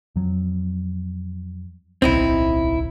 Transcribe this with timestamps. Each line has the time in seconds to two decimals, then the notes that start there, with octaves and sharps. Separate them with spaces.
0.16 F2 F#3
2.02 D1 B1 C4 D#4 E4